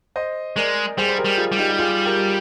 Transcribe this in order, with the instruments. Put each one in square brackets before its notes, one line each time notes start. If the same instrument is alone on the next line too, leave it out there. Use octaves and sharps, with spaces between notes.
[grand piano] C5 D#5
[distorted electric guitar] G#3 [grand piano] A#4 D5
[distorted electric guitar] G3 [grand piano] G#4 C5
[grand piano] C5
G4 A#4
[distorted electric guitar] G3
[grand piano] F4 G#4
[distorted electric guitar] G3
[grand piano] D#4 G4
G4
F4 G#4
G4 A#4